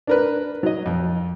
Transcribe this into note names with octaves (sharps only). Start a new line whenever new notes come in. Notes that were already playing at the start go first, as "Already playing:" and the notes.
D4 A#4 B4
F#3 D#5
F2